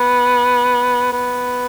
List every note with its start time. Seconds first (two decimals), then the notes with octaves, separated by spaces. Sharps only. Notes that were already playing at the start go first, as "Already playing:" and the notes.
Already playing: B3
1.13 B3